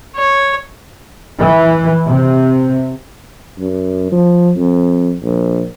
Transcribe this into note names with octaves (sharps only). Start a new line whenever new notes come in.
C#5
E3
C3
F#2
F3
F2
A#1